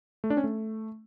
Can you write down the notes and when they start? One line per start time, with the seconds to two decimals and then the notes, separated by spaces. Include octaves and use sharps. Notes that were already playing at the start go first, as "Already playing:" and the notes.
0.24 A3
0.30 D4
0.37 C#4
0.44 A3